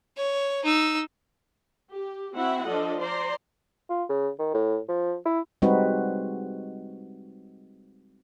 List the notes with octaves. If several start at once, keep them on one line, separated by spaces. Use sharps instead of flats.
C#5
D#4 E6
G4
C4 E4 F#4 E5 F#5
F3 D4 A4 D#5
C5 D5 A#5 C6
F4
C#3
D#3
A2
F3
E4
G3 G#3 C4 D#4 F#4 B4